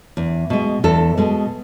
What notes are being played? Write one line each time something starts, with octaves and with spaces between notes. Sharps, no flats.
E2
B2 G#3
E2 A4
B2 G#3